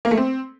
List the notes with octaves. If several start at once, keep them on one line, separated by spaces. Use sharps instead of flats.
A#3
A3
C4